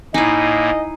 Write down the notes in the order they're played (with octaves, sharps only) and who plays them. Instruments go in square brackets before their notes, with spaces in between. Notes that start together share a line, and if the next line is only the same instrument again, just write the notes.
[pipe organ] A2 A#3 [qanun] D#4 E4 [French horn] D#5 [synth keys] G#5 C7 D#7